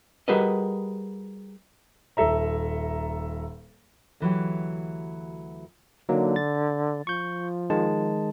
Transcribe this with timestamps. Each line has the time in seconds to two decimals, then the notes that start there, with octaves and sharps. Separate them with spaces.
0.28 G3 F#4 G#4 A#4 B4 D#5
2.17 D#1 A4 E5 A#5
4.20 D2 E3 F#3 G4
6.09 D3 F#3 A#3 D#4
6.36 A6
7.07 F3 C#6 G6
7.70 D#3 G#3 A5